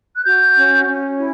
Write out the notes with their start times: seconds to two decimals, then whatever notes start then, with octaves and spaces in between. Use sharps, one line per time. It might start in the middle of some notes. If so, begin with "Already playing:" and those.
0.16 F#6
0.25 F#4 G6
0.56 C#4
0.87 C#4
1.18 E4